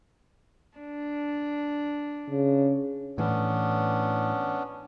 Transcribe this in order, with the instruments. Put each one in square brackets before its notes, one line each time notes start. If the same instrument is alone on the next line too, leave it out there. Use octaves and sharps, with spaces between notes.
[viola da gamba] D4
[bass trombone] C#3
[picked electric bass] A2 E3 [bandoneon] B3 C#4 D4